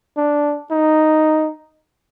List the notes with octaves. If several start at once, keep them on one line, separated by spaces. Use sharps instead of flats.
D4
D#4